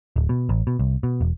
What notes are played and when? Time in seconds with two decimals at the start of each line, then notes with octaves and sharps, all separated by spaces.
0.16 D1
0.29 B2
0.49 A1
0.67 B2
0.79 C2
1.03 B2
1.21 E1